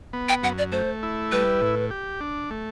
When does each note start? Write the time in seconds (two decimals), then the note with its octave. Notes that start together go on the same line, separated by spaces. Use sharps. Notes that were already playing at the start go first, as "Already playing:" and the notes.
0.13 B3
0.29 G5
0.43 F#2 F#5
0.58 D5
0.72 A3 C5
1.03 E4
1.32 G3 B4
1.61 A2
1.91 G4
2.21 D4
2.51 A3